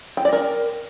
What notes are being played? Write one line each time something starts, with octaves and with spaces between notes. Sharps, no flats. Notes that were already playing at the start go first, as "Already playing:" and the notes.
G5
D5
A#4